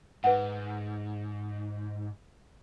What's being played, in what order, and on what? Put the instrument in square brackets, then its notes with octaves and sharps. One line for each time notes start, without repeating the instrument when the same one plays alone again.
[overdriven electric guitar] G#2 [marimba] B4 F#5